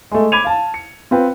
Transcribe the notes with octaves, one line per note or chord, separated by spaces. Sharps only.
G#3 A3
B5 D6 G#6 D#7 F7
F5 A5
C#7
C4 F4 B4 G5